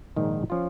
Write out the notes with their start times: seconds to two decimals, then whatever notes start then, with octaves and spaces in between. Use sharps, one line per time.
0.16 A#1 G#2 D#3
0.50 F3 C#4 F4